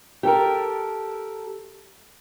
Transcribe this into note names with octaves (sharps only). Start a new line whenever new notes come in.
G4 A4 A#4